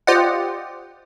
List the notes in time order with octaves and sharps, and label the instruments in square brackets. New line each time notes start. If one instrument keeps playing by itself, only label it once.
[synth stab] F4 G4 C5 D5 D#5 F#5